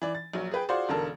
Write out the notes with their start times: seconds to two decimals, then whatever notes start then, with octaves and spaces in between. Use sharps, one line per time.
0.02 E3 D5
0.15 A6
0.33 A#1 F#3
0.51 G#4 B4 G5
0.69 F4 F#4 G#4 C5 D5
0.89 E1 D3 A#4 A5